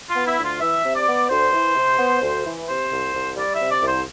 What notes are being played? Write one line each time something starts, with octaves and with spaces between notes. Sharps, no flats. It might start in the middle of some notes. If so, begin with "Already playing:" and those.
F4
B3
E4
D2
F4
E3 E5
C3
D5
B3
D2 C5
E3
C3
B3
D2
E3
C3 C5
C2
C2
G3 D5
E5
C3
D5
C2
C5